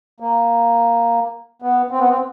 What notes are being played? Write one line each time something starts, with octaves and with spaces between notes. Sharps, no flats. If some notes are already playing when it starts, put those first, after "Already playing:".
A#3
B3
C4
B3
C4